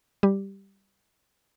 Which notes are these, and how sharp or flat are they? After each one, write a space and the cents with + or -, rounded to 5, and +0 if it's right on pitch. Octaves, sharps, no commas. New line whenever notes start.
G3 +0 G4 +0